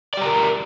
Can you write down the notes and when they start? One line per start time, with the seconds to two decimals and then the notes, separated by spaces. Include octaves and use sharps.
0.14 D5
0.17 G4
0.21 A#5
0.25 A#4